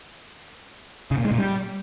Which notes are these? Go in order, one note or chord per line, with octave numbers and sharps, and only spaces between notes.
C#3
A#2
G#3
A#2
G3